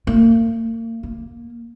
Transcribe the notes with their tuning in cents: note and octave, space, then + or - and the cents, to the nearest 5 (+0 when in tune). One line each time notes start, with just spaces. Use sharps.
A#3 -40
A#3 +10